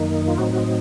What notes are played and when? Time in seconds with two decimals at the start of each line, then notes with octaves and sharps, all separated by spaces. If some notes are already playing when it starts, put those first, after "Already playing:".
Already playing: F#2 D#3 A#3 D#4
0.28 F4
0.38 A2 F#3 C4 D#4 F#4
0.53 F#4